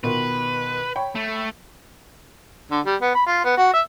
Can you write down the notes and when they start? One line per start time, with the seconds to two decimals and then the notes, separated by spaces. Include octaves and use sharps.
0.04 B2 D#3 F4 B4
0.96 C#5 G5 B5
1.16 A3
2.71 D3
2.86 G3
3.01 B3
3.14 B5
3.26 F4
3.45 B3
3.57 F#4
3.73 E5